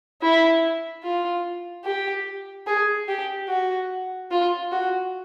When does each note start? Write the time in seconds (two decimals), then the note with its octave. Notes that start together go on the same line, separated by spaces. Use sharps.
0.22 E4
1.03 F4
1.85 G4
2.67 G#4
3.08 G4
3.49 F#4
4.31 F4
4.72 F#4